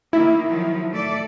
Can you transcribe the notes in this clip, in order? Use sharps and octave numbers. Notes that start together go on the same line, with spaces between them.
D#3 A#3 E4
D#3 F3 F#3
A3 A4 D5